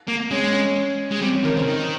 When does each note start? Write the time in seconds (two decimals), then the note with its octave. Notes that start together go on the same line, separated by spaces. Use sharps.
0.08 A#3
0.31 G#3 C#4
0.53 C#4
1.11 G#3
1.21 G3 C4
1.32 C#4
1.43 D#3 A#4
1.55 C#3 C5
1.66 D#3 A#4